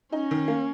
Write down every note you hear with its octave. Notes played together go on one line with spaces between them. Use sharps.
C#4 D#4
D#3
A#3